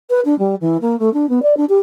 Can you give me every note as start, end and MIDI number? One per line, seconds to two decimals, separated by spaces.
0.10 0.20 71
0.25 0.37 62
0.39 0.55 55
0.61 0.77 52
0.81 0.98 58
0.99 1.12 57
1.13 1.28 62
1.29 1.42 59
1.42 1.57 74
1.57 1.65 62
1.69 1.79 67